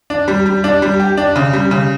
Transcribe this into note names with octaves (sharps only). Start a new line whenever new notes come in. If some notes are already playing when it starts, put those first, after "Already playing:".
D4
G3
G3
D4
G3
G4
D4
C#3
G3
C#3